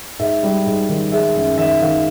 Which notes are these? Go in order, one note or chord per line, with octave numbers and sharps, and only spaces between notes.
G#2 E5
G3
G#2
D#3
G#3 E5
F#2 E5
D#3 E5
D#3 F5